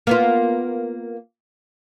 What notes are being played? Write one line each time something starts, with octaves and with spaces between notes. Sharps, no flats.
A#3 B3 F4